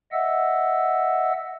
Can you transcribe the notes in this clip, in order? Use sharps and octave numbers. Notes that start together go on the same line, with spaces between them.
D#5 E5 F#5 E6